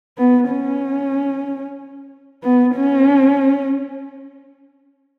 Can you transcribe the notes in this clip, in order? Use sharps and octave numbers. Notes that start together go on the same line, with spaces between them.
B3
C#4
B3
C#4